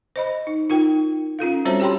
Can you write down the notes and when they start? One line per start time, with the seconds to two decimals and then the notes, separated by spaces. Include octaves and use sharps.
0.16 C5 D#5 B5
0.47 D#4
0.70 D#4 F4 A#4 G5
1.39 C#4 F4 A4 F5
1.65 G3 C4 F#4 C5 C#5 A#5
1.80 G4 C#5 G5 A5 B5 C6